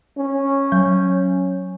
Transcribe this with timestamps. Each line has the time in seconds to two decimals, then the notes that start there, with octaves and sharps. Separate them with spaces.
0.18 C#4
0.72 F#3